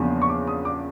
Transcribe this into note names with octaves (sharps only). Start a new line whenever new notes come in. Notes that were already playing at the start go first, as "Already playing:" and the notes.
Already playing: E2 C#3 F3 A#3 D4
C#6
D6
D#6
D6